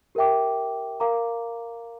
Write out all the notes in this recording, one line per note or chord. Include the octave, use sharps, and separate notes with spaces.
G4 A#4 E5 G5 D6
A#4 F5 A#5 D6